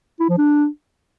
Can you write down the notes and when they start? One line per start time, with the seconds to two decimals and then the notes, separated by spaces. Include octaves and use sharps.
0.20 E4
0.29 F3
0.38 D4